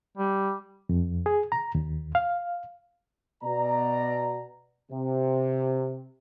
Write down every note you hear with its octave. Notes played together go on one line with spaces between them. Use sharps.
G3
F2
G#4
A#5
D#2
F5
B2 D5 A#5
C3